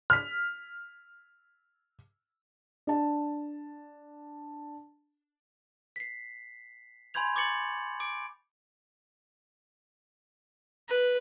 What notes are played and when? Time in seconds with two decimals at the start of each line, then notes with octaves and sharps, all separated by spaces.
0.10 F6 B6
2.87 D4 A5
5.96 B6 C7
7.14 G#5 B5 C6 G6 G#6 F7
7.36 C#6 D6 G#6 A6 C#7 F#7
8.00 D6 D7
10.88 B4